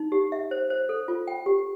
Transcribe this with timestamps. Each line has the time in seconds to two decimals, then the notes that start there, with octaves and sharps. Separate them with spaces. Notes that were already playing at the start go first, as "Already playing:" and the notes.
Already playing: D#4
0.12 G4
0.32 E5
0.51 C5
0.70 C5
0.89 A4
1.08 F4
1.27 G5
1.46 G4